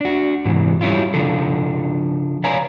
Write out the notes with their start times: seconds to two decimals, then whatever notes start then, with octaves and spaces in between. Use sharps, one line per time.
0.01 D4 F#4
0.45 G#2 C3 E3
0.81 F#3 G3 C#4 E4 F4
1.14 C#3 F3 D4 A4
2.44 B4 C#5 D5 F5 G#5 A#5